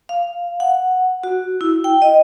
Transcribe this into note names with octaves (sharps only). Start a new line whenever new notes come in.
F5
F#5
F#4
E4
G5
D#5